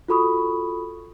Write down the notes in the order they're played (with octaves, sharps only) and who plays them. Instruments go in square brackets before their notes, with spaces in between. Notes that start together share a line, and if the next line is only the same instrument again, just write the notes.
[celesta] F4 F#4 A4 B5 C#6 D#6